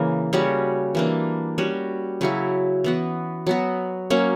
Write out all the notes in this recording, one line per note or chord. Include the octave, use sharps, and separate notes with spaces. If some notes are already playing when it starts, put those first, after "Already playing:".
Already playing: C#3 E3 A#3
C#3 G3 C#4 F#4
E3 A#3 D4
G3 C#4 F#4
C#3 F#3 C#4 E4
E3 B3 F#4
F#3 B3 F#4
F#3 A#3 C#4